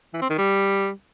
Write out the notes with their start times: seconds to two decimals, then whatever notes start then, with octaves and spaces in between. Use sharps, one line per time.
0.13 E3
0.22 C4
0.30 D#3
0.38 G3